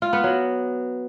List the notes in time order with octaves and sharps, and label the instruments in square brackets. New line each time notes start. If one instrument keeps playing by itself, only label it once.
[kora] F4
B3
F#3